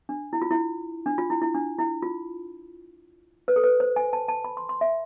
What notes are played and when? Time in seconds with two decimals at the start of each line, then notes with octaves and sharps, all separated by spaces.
0.09 D4
0.33 E4
0.42 F4
0.51 E4
1.06 D4
1.18 F4
1.30 E4
1.42 E4
1.54 D4
1.79 E4
2.02 F4
3.48 B4
3.56 A4
3.64 B4
3.80 C5
3.96 G#5
4.13 A5
4.28 A5
4.44 B5
4.57 C6
4.69 C6
4.81 E5